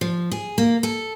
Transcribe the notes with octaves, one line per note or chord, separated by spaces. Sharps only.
F3
G#4
A#3
A4